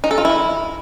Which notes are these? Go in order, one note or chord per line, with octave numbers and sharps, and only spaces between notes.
D#4
A4
F4
E4